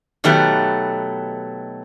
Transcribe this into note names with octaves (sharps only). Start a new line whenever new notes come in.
B2 D#3 F#3 A3 B3 G4